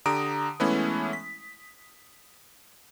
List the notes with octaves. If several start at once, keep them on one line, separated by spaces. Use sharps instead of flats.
D3 G4 A#5 D#6 D7
E3 G#3 A3 B3 C#4 E4
B6